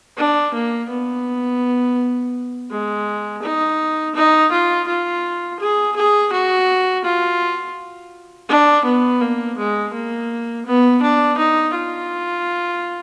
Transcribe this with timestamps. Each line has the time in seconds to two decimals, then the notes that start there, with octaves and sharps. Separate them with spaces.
0.17 D4
0.54 A#3
0.90 B3
2.71 G#3
3.43 D#4
4.15 D#4
4.52 F4
4.87 F4
5.60 G#4
5.96 G#4
6.32 F#4
7.04 F4
8.49 D4
8.85 B3
9.21 A#3
9.58 G#3
9.94 A#3
10.66 B3
11.02 D4
11.38 D#4
11.74 F4